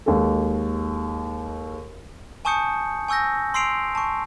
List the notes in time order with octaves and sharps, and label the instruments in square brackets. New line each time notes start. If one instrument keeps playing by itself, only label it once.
[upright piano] D#2 G#3 A4
[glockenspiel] G#5 A5 C#6 D#6 G6 C#7
G#5 C#6 E6 G6 A#6
C6 E6 C7 D7 F7
A5 C#6